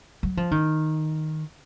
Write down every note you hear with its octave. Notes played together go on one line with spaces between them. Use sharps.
F#3
F3
D#3